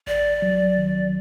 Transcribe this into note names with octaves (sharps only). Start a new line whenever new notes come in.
A1 D5
F#3
D#3